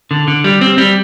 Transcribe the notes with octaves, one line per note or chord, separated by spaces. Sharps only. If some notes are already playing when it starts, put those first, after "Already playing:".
D3
D3
G3
C4
G3